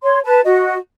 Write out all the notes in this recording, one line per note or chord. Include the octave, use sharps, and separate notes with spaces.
C#5 C6
B4 A5
F#4 D#5